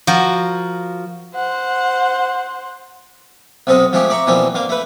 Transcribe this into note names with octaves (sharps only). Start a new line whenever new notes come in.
F3 F#4 A#4
C5 F#5
B1 C3 C4 A4 D#5
F3 G#3 A3 C#4 G4
D5 E5 A#5 C#6
B2 E3 F3 G3 A#3 C4
G2 A#3 F5
A3 B4